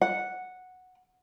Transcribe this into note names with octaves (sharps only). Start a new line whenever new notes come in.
F#5